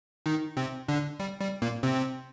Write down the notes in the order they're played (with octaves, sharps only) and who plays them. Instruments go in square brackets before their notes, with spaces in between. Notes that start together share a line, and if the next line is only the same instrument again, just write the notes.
[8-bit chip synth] D#3 D#4
C3 C4
D3 D4
G3
G3
A#2 A#3
C3 C4